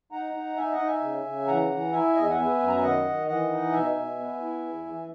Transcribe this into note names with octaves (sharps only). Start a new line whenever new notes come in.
D#4 F#5 A#5
D#4
D#4 E5 G#5
D#5 F#5
D#4
E5 G#5
C#3
C#3
E3 F#5 A#5
E3
E4 E5 G#5
E2 D#5
E5
F#5
B3 E5 G#5
F#2
A#5
G#5
D#3 D#5 F#5
D#3
E3 D#5 F#5
D#4
B2 E5 G#5
B2
B3
E4
E2
E3